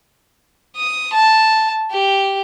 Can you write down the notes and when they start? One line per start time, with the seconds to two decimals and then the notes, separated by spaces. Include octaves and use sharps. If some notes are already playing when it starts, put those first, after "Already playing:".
0.76 D#6
1.13 A5
1.92 G4